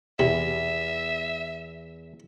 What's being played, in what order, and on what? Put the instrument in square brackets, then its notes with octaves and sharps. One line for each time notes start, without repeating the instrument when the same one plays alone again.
[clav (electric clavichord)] E2 [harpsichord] C3 [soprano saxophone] E5